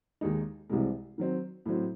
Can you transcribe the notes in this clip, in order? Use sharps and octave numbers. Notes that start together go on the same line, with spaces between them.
D#2 D#3 G#3 D#4
C2 C3 E3 G#3
D#3 F#3 C4
A2 F#3 C4